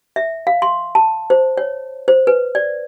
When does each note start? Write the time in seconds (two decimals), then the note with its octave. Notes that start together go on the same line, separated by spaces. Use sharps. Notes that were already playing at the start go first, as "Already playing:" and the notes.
0.16 E5
0.47 F5
0.62 C6
0.95 A5
1.30 C5
1.57 C#5
2.08 C5
2.27 B4
2.55 D5